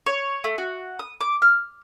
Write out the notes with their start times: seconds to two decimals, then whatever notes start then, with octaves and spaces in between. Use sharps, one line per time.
0.06 C#5
0.44 A3
0.58 F#4
0.99 D#6
1.21 D6
1.42 F6